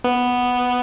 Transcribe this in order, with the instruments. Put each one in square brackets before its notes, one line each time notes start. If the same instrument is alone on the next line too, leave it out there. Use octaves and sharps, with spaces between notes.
[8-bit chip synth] B3